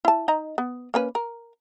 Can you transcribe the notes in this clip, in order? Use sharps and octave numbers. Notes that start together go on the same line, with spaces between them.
E4 A5
D#4 D#5 A#5
B3
A#3 C#4 B4
A#4